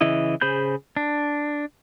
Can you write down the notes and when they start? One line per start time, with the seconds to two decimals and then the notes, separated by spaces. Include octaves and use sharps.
0.01 C#3 E3 E4 D#5
0.41 C#3 G#4 C5 B5 G6
0.97 D4